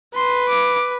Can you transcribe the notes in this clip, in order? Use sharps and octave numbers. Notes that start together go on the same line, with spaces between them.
B4 C6
D6